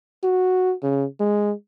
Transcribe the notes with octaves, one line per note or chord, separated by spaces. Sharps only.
F#4
C#3
G#3